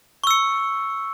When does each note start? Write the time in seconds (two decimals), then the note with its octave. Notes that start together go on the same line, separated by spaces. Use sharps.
0.24 C#6
0.27 E6
0.31 C#7